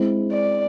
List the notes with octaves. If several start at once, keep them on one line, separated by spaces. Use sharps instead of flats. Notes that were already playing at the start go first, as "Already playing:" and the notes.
Already playing: G#3 C4 E4
D5